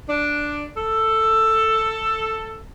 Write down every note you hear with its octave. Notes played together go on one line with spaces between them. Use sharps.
D4
A4